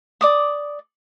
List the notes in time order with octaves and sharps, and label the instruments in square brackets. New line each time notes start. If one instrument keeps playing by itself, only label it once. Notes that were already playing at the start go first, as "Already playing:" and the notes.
[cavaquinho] D5 D6 D#6